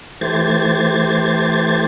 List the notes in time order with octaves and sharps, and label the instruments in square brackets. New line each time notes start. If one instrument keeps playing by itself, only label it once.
[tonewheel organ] E3 A3 G4 C5 G#6 A6